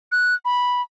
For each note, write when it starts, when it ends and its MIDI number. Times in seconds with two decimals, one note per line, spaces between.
0.12 0.34 90
0.45 0.82 83